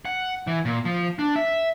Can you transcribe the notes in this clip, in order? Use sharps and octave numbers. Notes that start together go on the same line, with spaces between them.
F#5
E3
A#2
F3
D4
E5